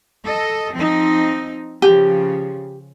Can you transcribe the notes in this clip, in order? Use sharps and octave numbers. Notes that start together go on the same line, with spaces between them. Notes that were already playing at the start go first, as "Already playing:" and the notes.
A4 D#5
F3 C4 D#4
C#3 F3 G4